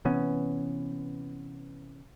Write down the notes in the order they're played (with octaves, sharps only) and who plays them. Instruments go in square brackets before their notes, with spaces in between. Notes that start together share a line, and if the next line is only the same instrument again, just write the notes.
[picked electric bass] C3 E3 B3 C#4